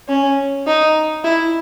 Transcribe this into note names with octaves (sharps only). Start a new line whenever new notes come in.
C#4
D#4
E4